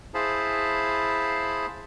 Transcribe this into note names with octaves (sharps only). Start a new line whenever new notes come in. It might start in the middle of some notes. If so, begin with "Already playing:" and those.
E4 G#4 C5 F5 A5 B5